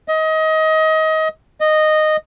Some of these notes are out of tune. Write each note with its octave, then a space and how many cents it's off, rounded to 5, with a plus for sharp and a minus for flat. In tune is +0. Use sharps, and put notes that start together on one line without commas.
D#5 +25
D#5 -10